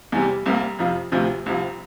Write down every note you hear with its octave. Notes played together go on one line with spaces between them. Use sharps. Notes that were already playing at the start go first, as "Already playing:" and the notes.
E2 C3 G3
C2 C3 G3 A#3
F2 C3 F3
D2 C3 F3
C2 C3 F3